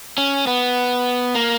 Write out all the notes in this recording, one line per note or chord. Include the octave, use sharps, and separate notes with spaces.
C#4
B3
A#3